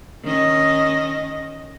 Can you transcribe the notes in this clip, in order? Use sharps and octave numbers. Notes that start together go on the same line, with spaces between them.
D#3 C#4 D#5